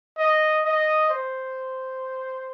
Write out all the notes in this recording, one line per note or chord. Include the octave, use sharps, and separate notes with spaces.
D#5
D#5
C5